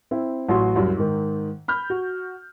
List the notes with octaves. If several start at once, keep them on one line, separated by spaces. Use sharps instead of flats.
C4 E4
A1 F#3 F#4 C6
C2 F#2
G#2 D#3
B5 F6 G6
F#4